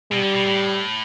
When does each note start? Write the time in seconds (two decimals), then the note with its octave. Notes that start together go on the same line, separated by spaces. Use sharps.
0.11 B2 G3
0.23 D3
0.34 B2
0.46 A2